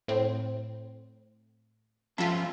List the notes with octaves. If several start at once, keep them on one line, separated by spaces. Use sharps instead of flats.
A2 C4
F3 C#4 F4 E5 A5